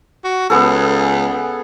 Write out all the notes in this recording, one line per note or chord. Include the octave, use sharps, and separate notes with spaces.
F#4
C#2 B3 G#4 A4